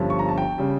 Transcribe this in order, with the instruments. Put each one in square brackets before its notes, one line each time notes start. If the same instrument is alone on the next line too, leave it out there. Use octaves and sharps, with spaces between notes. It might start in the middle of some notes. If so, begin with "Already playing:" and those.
Already playing: [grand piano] G1 G2 F3 C#4
C#6
A#5
A5
G5
C#3 G3